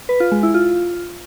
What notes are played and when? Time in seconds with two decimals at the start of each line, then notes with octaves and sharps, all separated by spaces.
0.09 B4
0.20 F4
0.32 G#3
0.43 E4
0.54 F4